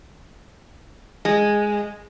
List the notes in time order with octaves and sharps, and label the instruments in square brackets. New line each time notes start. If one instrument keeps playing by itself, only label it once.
[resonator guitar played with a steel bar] G#3